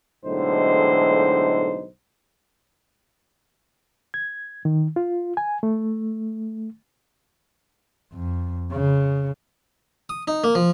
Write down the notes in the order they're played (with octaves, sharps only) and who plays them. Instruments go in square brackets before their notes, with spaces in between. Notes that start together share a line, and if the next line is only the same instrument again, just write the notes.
[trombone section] B1 A2 D3 G#3 D#4 C5
[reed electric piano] G#6
D#3
F4
G#5
A3
[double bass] F2
C#3
[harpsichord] D#6
D#4
A#3
F3